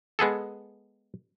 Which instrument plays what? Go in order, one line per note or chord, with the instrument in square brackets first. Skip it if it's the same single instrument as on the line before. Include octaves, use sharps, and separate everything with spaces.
[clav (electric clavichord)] G#3 B3 G#4 A4